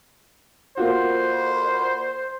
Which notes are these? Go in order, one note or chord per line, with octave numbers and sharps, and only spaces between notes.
A#3 F4 F#4 C5